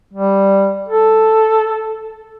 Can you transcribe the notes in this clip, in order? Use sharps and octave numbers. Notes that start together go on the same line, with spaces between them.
G3
A4